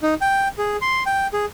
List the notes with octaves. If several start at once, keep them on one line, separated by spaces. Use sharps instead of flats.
D#4
G5
G#4
C6
G5
G#4